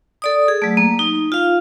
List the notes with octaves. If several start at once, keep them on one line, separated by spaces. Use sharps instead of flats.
A4 D5 D#6
G#4
F#3 A3
A#3
D#4
F4 F5